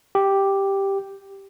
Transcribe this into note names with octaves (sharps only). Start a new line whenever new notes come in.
G4